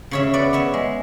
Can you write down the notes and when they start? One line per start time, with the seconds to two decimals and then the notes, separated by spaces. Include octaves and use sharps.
0.11 C#3 C#5 E5
0.33 B3 D5 F#5
0.53 B3 C#5 E5
0.74 G#3